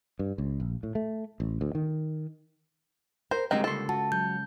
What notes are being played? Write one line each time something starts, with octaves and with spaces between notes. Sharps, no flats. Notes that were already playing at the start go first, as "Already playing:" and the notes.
G2
C#2
A#1
A2
A3
A1
D2
D#3
A#4 C5
A2 D3 D#3 G3 G#3 A#3 C4 D#4
C#2 A4 C6
F#4 A5
F#3 G6